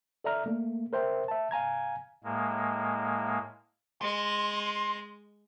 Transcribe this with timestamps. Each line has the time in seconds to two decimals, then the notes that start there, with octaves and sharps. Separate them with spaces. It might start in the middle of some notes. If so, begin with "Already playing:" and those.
0.24 A4 D5 E5 A#5 F6
0.46 A3 A#3
0.93 A#4 C5 E5 G5
1.28 E5 A5
1.51 F5 G#5 A#5 G#6
2.24 A2 G#3 A#3
4.01 G#3 D#5 C6